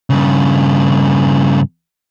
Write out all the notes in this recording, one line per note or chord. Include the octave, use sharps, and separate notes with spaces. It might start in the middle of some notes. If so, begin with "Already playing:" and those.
G2 C#3